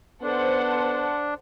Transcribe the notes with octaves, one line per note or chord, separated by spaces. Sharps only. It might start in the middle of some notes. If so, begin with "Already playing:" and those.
B3 D4 A4 C5 F#5